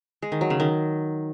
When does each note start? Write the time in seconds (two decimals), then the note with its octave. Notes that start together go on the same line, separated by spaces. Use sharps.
0.22 G#3
0.32 D#3
0.41 F#3
0.50 C#3
0.60 D#3